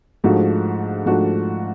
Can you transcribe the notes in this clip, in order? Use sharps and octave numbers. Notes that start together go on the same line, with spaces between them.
G#2 F3 A3 D4 F#4
G#2 F3 A3 D4 F#4